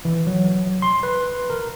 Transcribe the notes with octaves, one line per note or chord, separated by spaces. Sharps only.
E3
F#3
F#3
C6
B4
A#4